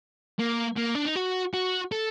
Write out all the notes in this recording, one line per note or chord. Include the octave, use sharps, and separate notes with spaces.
A#3
A#3
D4
D#4
F#4
F#4
A4